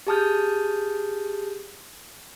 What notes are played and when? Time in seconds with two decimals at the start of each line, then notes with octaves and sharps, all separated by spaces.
0.07 G4 G#4 A5 D#6 F6 G6